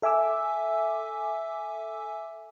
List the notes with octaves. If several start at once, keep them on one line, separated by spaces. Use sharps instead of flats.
A4 E5 G#5 D6 E6